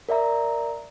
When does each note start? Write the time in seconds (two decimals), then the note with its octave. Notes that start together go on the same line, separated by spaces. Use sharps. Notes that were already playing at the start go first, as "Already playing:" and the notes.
0.09 A#4 D5 E5 A#5